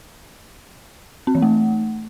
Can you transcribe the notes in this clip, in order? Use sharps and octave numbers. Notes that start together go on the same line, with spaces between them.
C4
E3
A3